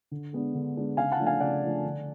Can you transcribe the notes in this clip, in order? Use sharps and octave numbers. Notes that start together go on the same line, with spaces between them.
D3
G#3 B3 D4
D3
G#3 B3 D4
C#3 F5 G#5
F#5 A5
F3 A3 D4
F5 G#5
C#3 D5 F#5
F3 A3 D4
D3